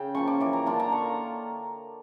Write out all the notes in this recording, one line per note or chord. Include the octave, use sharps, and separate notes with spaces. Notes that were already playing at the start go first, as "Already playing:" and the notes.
Already playing: C#3 G5
F3 A#3 C#4 C#6
D6
E3 D6
A#5
A#3 D4 F4 A5
A#5
D3 C#6